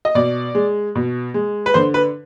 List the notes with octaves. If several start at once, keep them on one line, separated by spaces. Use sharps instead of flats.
D#5
B2 D5
G#3
B2
G#3
B4
D3 C5
B4